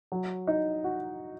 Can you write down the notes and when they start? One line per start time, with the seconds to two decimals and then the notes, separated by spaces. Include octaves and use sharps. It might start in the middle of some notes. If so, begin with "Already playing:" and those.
0.12 F#3
0.47 D#4
0.84 F#4